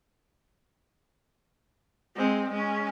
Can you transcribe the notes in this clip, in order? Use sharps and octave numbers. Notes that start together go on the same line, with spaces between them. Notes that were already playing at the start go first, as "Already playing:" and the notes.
G#3 C4
G#3 C#4